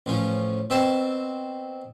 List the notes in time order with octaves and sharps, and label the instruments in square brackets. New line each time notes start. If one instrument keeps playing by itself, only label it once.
[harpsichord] A1 F3 C#4
B2 C4 E5 A5